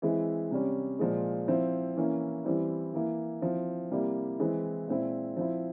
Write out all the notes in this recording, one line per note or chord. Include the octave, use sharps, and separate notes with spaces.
E3 G#3 C4 E4
C3 G3 C#4
A#2 F3 G#3
F3 C4 E4
E3 A#3 C#4 E4
E3 G3 C4 E4
E3 A#3 E4
F3 C4 E4
C3 G3 A#3 E4
E3 G#3 C4 E4
A#2 G#3 C4 E4
F3 C4 E4